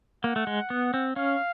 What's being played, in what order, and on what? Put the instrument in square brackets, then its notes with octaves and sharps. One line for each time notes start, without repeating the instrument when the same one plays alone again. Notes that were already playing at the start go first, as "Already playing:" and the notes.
[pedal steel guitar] A#3 [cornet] F#5
[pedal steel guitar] A3
G#3
B3
C4
[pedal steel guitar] C#4 [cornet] F5